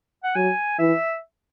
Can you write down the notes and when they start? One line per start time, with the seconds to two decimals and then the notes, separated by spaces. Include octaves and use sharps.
0.24 F#5
0.35 F#3 G#5
0.79 E3 E5